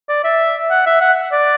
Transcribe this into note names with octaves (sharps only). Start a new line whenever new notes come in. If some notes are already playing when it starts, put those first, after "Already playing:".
D5
E5
F#5
E5
F#5
D5